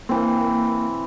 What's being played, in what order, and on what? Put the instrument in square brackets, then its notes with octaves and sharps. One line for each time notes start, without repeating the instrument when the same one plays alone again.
[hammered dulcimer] E3 C4 [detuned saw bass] A#3